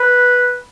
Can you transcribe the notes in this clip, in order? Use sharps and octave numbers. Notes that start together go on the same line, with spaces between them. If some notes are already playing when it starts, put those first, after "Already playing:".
Already playing: B4